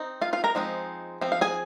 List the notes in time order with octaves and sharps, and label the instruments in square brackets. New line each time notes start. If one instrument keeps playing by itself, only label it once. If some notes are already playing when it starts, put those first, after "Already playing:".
Already playing: [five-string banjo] C4 D#4
F4 F5
F4 F5
A#4 A#5
F3 G#3 C4 D#4
F3 C4
F5
G#4 G#5